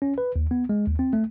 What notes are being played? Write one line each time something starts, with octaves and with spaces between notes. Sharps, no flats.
C#4
B4
D#2
B3
G#3
D#2
C4
A3